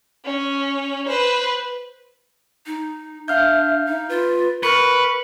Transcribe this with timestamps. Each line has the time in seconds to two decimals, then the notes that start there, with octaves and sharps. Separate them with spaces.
0.25 C#4
1.07 B4 C5
2.66 D#4
3.28 D4 E5 F5 F6 G6
3.86 D#4
4.09 F4 B4
4.63 A#4 B4 C#6 C#7